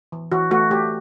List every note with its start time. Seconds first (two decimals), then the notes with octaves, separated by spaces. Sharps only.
0.12 E3
0.31 E3 F#4
0.51 A3 F#4
0.71 A3 G4